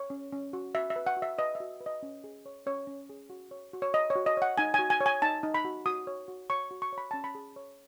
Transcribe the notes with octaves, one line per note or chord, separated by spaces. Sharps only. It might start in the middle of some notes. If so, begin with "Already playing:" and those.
Already playing: C#5
C#4
C#4
F#4
F#4 E5
E5
B4
F#5
F#4
E5
B4 D#5
E5
F#4
B4
D#5
C#4
G#4
C#5
C#4 C#5
C#4
G#4
F#4
C#5
F#4
C#5
C#5 D#5
C#5
F#4
D#5
C#5 F#5
D#4 G#5
F#4 G#5
G#5
C#5
G#5
D#4 A5
D#4
B5
F#4
F#4 D#6
C#5
F#4
C#5 C#6
F#4
C#6
C#5
B5
C#4 A5
B5
G#4
C#5